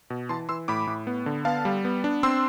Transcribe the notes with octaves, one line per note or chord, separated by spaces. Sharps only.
B2
E3 A5 C6
E3 C6 E6
A2 B5 D6
A2
B3
D3
B3 F5 A5
G3
B3
D4
C4 C6 E6